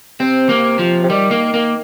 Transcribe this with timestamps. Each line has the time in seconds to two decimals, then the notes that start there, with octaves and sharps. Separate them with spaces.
0.20 C3 C4
0.49 A#3
0.79 F3
1.03 C3
1.10 D#3 G3
1.31 A#3
1.54 A#3